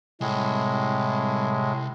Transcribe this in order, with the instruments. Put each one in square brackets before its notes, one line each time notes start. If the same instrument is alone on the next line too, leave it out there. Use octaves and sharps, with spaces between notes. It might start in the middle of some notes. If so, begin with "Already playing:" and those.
[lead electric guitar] C2 [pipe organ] A2 G#3